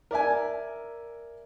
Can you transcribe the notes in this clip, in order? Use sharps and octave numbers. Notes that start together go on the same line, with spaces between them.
A#4 D5 E5 G#5